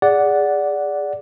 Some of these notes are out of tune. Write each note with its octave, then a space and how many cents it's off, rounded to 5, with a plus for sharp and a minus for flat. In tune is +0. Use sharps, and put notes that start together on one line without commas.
G#4 -15 D5 -10 F#5 +0